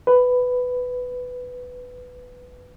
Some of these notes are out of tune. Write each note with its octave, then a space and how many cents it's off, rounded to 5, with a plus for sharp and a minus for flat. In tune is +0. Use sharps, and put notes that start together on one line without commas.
B4 +10